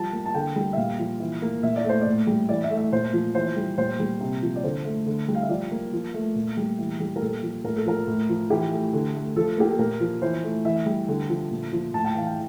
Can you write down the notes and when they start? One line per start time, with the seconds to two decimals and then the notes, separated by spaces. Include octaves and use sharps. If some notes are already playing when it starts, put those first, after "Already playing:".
Already playing: F3 G3 A5
0.13 A#3
0.26 A5
0.35 D3 G5
0.56 G3
0.73 E5
0.77 A#2 F5
0.99 F3
1.20 E3
1.42 A#3
1.63 A#2 E5
1.76 D5
1.84 A3 C5
2.01 A2 D5
2.27 G3
2.49 E3 D5
2.64 E5
2.70 A3
2.77 E5
2.92 A#2 C5
3.13 F3
3.35 E3 C5
3.56 G3
3.78 A#2 C5
4.00 G3
4.21 C3
4.42 F3
4.56 D5
4.64 D3 C5
4.85 A3
5.06 D3
5.28 G3
5.35 F5
5.42 E5
5.49 F3 D5
5.71 A#3
5.93 F3
6.14 A3
6.36 A#2
6.57 G3
6.79 E3
7.00 G3
7.16 A#4
7.21 A#2 A4
7.43 F3
7.64 A2 A#4
7.77 A4
7.86 F3 A#4
8.07 A2
8.29 F3
8.50 E3 G4
8.72 A3
8.93 D3
9.15 A3
9.36 F3 A4
9.57 A#3 G4
9.69 A4
9.79 A#2 A#4
10.00 F3
10.22 E3 C5
10.44 A3
10.65 E3 E5
10.86 G3
11.08 D3
11.29 F3
11.51 A#2
11.72 F3
11.94 A2 A5
12.05 G5
12.15 E3 F5
12.27 G5